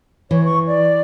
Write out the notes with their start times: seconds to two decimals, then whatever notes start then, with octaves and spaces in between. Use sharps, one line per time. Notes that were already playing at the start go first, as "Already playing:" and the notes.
0.31 E3 C#5
0.45 C#6
0.67 D5